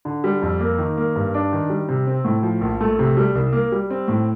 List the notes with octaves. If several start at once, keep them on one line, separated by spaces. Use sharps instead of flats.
D3
G3
F2
A#3
D#3
A#3
G2
D4
D#3
G3
C3
C4
A2
F3
A#1
A3
C3
G3
C2
A#3
G3
C4
A2